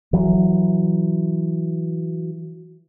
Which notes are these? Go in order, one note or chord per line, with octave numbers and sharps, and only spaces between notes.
E3 F#3